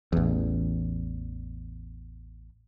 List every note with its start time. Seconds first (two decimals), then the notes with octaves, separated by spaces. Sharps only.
0.13 A1 E2